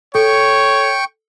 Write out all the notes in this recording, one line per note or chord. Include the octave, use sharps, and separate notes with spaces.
A4 C#5 G5 C#6